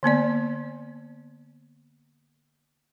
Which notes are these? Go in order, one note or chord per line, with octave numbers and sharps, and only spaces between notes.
D3 A#3 B3 D5